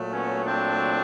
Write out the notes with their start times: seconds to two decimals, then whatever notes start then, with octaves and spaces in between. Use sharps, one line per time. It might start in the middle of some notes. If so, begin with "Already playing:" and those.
Already playing: A#2 F#3 A3
0.13 B3 C#4
0.45 C4 D4